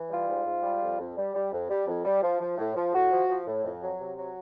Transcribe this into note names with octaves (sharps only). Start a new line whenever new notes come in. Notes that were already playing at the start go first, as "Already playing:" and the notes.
Already playing: E3
G3 F4
G#2
G#2
G3
F2
F2
G3
G3
F2
G3
F2
G3
F3
F3
A2
F3
A2 F#4
F3
F3
A2
F2
F#3
C3
F#3